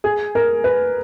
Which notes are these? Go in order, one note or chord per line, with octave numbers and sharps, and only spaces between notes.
G#4
A#4
B4